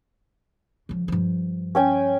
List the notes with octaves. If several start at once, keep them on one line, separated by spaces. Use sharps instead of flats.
C#3 F3
G2 F3
C#4 G5 G#5